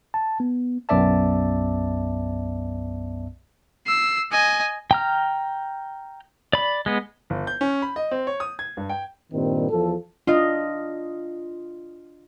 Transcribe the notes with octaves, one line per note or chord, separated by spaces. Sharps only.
A5
B3
B1 F#2 B3 D5 E5 A5
E6 C7
D#5 G#5
G5 A#5 F6
D5 B5
G#3 B3
G1
G6
C#4
B5
D#5
C4
C#5
D#6
G#6
G2
G5
G2 A#2 D#3 G3 C4
E2 F3 A4
D4 F4 D#5